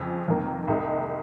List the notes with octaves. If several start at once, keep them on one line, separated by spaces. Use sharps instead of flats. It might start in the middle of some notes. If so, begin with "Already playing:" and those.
Already playing: F2 C#3 F3 C4
F1 F2 D#3 A#3
C2 C3 D#3 G#3 D#4